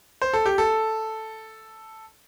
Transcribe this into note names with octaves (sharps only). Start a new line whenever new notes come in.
C5
A4
G4
A4